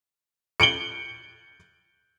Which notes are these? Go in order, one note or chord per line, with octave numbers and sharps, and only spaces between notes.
C#7 D7 F#7 G7